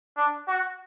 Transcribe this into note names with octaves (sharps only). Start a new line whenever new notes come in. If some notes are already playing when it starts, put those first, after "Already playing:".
D4
F#4